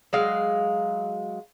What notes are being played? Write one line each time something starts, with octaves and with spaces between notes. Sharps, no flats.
F#3 G#3 F5